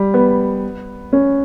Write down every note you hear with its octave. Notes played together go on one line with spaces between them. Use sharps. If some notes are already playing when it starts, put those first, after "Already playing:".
Already playing: G3
B3
C#4